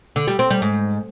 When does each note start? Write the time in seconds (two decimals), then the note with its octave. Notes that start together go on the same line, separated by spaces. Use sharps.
0.16 D3
0.27 G3
0.39 C4
0.51 G3
0.62 G#2